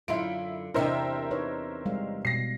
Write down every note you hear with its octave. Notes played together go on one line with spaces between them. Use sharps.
F#2 D3 E4 F4 D7
E2 C3 D4 E4 A#4 C5 D#5 E5
D#4 B4 C#5
G3 G#3 F5
B2 A#6 C7